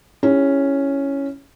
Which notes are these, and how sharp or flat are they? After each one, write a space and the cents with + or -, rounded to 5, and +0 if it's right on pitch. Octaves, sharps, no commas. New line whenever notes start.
C#4 +0 E4 +0 G4 +45